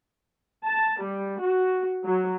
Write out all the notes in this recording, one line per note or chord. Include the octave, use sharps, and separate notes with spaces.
A5
G3
F#4
F#3